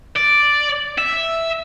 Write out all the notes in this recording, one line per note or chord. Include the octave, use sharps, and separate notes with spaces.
D5
E5